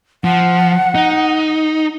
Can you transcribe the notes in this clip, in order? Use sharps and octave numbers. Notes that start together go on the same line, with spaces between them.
F3 F#5
D#4